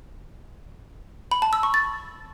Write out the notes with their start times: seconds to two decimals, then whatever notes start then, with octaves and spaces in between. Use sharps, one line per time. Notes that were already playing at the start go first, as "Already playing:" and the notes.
1.31 B5
1.42 A5
1.53 E6
1.63 C#6
1.74 A6